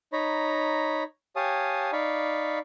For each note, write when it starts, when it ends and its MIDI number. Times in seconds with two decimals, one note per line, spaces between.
0.13 1.03 63
0.13 1.03 73
0.13 1.03 82
0.13 1.03 83
1.36 1.91 67
1.36 1.91 73
1.36 1.91 77
1.36 1.91 80
1.36 1.91 81
1.36 1.91 87
1.93 2.59 63
1.93 2.59 74
1.93 2.59 77
1.93 2.59 83
1.93 2.59 85